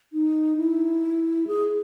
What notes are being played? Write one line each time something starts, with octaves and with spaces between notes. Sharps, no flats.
D#4
E4
G#4